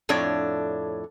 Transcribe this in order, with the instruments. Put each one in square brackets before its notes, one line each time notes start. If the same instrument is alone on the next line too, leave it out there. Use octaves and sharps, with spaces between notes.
[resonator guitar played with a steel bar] F2 A2 D4 C#5 D5